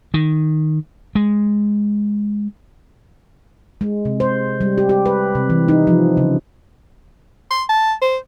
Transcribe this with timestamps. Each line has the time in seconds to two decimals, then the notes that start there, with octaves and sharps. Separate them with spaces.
0.14 D#3
1.15 G#3
3.81 G#3
4.05 C3
4.20 C5
4.61 G3
4.78 G4
4.89 G4
5.06 B4
5.35 C3
5.50 E3
5.68 D#4
5.87 F3
6.17 C#3
7.51 C6
7.69 A5
8.02 C5